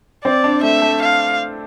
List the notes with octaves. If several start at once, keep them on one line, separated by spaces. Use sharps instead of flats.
C4 D5
D4
A3 E5
A3
F5